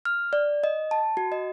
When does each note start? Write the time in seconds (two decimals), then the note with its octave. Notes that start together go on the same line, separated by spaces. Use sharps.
0.05 F6
0.33 D5
0.64 D#5
0.91 A5
1.17 F#4
1.32 D#5